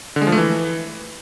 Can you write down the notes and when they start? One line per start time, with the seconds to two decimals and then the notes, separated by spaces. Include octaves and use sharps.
0.16 D3
0.21 G#3
0.27 F3
0.32 A3
0.38 E3